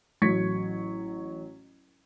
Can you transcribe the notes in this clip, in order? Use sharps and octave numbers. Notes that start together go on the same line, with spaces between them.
A1 F#3 C#6 G#6 B6 C#7